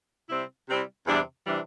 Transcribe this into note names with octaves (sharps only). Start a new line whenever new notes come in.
C3 G3 C4 E4
C3 G3 C4 E4
E2 C3 E3 G3 D4
C3 E3 G3 D4